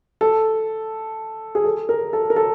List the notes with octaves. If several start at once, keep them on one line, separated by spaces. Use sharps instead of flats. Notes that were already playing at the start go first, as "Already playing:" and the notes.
A4
G#4
A4
A#4
A4
A#4
A4